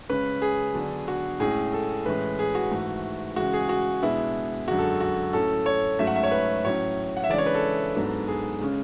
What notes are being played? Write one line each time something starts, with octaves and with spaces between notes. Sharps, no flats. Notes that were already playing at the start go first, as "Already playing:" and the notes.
C#3 G#3 C#4 B4
G#4
D3 F#3 B3 D4
F#4
A2 G#3 C#4 G#4
A4
A2 E3 G#3 C#4 B4
G#4
F#4
G#2 E3 A3
C#3 E3 G#3 F#4
G#4
F#4
B2 G#3 B3 D4 E4
F#2 D3 G#3 F#4
A4
F#4
A2 F#3 C#4 A4
C#5
G#2 F#3 A3 C#4 E5
F#5
E5
C#5
B4
A2 F#3 C#4 C#5
F#5
E5
C#3 E3 G#3 D4 D5
C#5
B4
A4
G#2 F#3 B3 D4
G#4
C#3 G#3 C#4